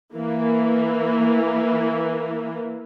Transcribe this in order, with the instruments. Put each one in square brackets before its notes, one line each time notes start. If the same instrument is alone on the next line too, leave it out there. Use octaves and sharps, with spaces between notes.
[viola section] E3 A#3